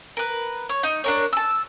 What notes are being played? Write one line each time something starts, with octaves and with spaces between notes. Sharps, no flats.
A#4 B4
C#5
D#4
D4 A#4 C#5
A5 E6